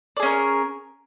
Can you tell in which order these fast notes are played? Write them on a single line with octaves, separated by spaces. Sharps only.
D5 G#4 C#4 A#4